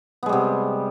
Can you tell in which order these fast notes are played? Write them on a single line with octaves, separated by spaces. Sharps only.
B3 G#3 G3 C3